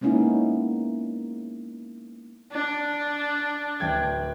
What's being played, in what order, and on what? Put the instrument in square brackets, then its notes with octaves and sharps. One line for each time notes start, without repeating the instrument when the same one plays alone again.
[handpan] G#3 A#3 B3 C#4 D#4 E4
[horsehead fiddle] D4
[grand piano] D1 G5 G#6